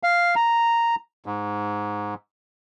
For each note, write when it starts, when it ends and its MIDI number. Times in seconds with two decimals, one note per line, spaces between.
0.03 0.35 77
0.36 0.95 82
1.26 2.14 44